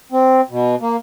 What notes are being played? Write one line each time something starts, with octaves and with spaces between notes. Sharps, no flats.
C4
B2
A#3